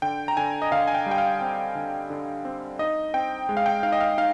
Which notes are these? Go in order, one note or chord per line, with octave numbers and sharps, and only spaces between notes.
D3 G5
A#5
D3 G#5
D#5
D3 F5
G#5
G5
G3
G5
F5
C4
D3
D3
C4
D#4 D#5
C4 G5
G#3
F5
G5
D#4 F5
D#5
F5
D#4 F5